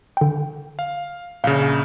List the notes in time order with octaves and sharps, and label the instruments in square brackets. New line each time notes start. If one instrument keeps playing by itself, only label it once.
[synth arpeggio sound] D3 G5
[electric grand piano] F5
[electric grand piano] A#1 C#3 [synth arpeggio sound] F5